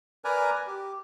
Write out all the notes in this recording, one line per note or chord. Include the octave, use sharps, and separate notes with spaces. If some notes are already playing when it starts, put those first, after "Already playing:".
A#4 B4 D5 G#5 A#5
G4